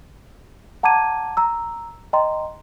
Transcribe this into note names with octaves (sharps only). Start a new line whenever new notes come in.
F#5 A5 A#5 D6 G#6 D#7
A#5 E6
D#5 G5 A#5 C6